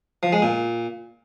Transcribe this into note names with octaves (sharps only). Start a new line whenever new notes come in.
F3
G#3
A#2